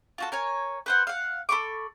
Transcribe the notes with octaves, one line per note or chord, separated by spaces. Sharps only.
F4 F#4 A4
A#4 C#5 G#5
B4 C5 F#5
F5 F#5
A4 B5 C#6 D6